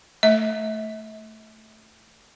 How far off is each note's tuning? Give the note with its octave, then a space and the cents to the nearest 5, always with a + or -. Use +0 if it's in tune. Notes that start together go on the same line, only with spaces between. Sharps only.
A3 +0 E5 -40